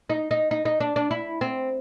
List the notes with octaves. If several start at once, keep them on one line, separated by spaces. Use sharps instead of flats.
D#4
D#4
D#4
D#4
D4
D4
E4
C4